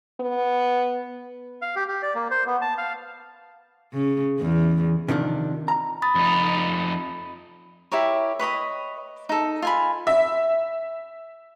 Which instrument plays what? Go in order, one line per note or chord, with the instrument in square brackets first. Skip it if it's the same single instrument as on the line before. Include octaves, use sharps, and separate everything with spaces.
[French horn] B3
[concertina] F5
G4
G4
D5
A#3
C5
B3
A5
F5
[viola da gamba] C#3
E2
[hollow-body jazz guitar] C3 D#3 F3 D4
A#5
[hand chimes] B5 D#6 A6
[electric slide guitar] F2 D#4
[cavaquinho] E4 G4 A#4 C#5
B4 C#5 D#5 B5
D#4 A4
F4 G#5 B5
[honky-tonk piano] E5